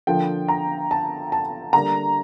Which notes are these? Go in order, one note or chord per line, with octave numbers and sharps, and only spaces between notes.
D3 F3 A#3 G5
A#5
A5
A5
D3 G3 A#3 A#5